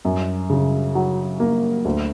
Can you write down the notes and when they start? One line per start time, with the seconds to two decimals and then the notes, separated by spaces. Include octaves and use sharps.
0.05 F#2
0.50 C#3
0.95 F#3
1.40 A#3
1.85 D2